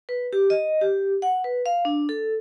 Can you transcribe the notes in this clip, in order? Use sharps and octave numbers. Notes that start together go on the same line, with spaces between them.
B4
G4
D#5
G4
F#5
B4
F5
D4
A4